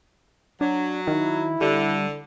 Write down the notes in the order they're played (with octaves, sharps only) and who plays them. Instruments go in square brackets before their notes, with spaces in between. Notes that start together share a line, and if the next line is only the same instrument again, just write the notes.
[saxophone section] F#3 [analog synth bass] D4
[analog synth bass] D#3 [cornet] E4
[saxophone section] D3 [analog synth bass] G3